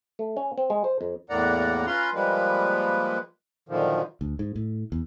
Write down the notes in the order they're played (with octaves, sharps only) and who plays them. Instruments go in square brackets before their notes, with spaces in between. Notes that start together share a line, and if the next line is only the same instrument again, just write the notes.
[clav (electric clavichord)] A3
C#4
C4
G#3
C5
F2
[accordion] E2 A2 A#3 D5 F#5 A#5
C#4 F4 B4 A#5 C6
F3 G3 G#3 A#3 B4
F#2 A#2 D3 D#3 F3
[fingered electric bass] D2
G#2
A2
E2